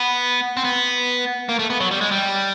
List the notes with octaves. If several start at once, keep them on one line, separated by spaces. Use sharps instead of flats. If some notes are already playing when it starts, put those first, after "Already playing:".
Already playing: B3
C4
B3
A#3
A3
B3
F#3
G3
G#3
G3